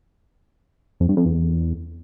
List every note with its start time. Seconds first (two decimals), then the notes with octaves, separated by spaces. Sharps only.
1.00 F2
1.09 G2
1.17 F2
1.25 E2